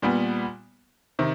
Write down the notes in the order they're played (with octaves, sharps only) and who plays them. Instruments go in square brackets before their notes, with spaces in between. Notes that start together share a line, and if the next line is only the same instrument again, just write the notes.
[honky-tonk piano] A#2 G3 B3
C3 D#3